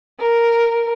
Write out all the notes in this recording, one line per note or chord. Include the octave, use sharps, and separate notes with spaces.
A#4